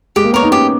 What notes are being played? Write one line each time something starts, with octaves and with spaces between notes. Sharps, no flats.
G#3 G4
A#3
B3 A#4 C#5
D#4
C#4 G4